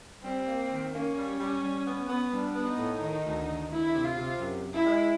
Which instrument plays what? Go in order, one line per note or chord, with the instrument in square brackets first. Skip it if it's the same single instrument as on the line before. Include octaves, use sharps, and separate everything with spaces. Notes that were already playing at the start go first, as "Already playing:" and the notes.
[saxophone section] G3 [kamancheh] C4
[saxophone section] A#3
D#3
[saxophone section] A#3 [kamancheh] C#4
[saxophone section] G3
G3
G3
B3
B3
[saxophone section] G3 [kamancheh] D4
[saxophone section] B3
[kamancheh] D#4
[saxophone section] A2
D#3
D2
D#3
[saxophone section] D2 [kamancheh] E4
[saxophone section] C3
[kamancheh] F4
[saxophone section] C3
F#2
F#2
[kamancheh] E4
[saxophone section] G#3